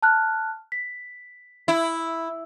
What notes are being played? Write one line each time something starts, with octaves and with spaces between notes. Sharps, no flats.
A5 F6 F#6
B6
E4